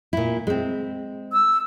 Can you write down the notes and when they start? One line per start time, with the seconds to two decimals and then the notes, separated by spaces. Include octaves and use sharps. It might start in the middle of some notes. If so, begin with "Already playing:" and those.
0.13 A#2 E4
0.47 G#3 C4
1.33 E6